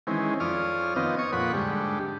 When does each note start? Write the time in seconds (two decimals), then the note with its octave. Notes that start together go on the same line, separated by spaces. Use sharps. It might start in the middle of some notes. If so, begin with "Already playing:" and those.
0.07 D#3 E3 G#3 C4 C#4
0.40 F2 C#5 D5 D#6 F6
0.96 D#3 B3 C4 F4 D#5
1.19 C#5 C#6 D#6
1.33 F2 A#2 F#5 B5 C#6
1.53 G#2 D3 G3